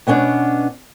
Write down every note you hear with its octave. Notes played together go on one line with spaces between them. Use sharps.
B2 B3 C#4 D4